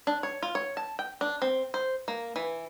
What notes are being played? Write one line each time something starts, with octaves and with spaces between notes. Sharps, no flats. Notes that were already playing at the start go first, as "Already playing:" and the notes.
D4
C#5
F4
C#5
A5
G5
D4
C4
C5
A#3
E3